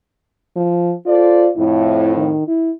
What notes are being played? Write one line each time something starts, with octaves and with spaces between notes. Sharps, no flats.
F3
F4 A4 C5 D5
F2 A2 E4
D#3
E4